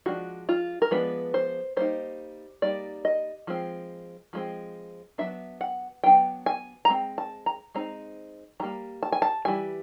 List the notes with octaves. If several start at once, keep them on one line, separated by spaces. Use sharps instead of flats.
F3 G#3 B3 D4 F#4
F4
A#4
F3 G#3 B3 D4 B4
C5
G3 A#3 D#4 C5
G3 A#3 D#4 D5
D#5
F3 G#3 C4
F3 G#3 C4
F#3 B3 D4 E5
F#5
F#3 B3 D4 G5
G#5
A#5
G#3 C4
A5
A#5
G#3 C4 D#4 A#5
E3 G3 A#3 A#5
A5
G#5
A5
E3 G3 G#5